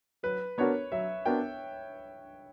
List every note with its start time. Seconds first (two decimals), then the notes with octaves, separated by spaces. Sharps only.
0.23 F#3 B4
0.58 B3 D4 F#4 A#4 C#5
0.92 F#3 E5
1.26 B3 D4 F#4 A#4 G5